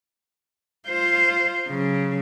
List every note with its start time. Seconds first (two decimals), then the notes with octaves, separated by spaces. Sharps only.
0.87 F4 C5
1.69 C#3 F#3